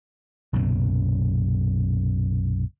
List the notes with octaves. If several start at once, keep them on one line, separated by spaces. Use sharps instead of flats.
B1 F#2 A#2 C#3